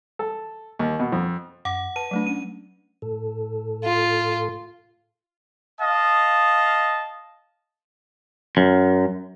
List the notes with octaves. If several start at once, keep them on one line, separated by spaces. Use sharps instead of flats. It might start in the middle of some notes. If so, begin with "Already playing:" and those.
A4
D#2
B2
F2
F#2 F#5 D6
B4 A5 D#7
F#3 A3 D4
C#4 D#7
A2 A4
F4
D#5 F5 A5
F#2